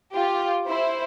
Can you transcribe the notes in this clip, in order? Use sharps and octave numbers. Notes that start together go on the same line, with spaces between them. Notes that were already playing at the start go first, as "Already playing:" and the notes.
F4 G4
E4 C5